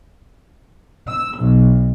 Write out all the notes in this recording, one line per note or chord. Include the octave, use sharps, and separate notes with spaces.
E6
B1